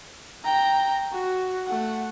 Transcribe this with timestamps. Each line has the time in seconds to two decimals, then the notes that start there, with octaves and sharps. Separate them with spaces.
0.44 G5 A#5
1.12 F#4
1.67 A3 F#5